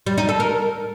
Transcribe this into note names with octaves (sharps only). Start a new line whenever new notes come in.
G3
D#4
A4
A#4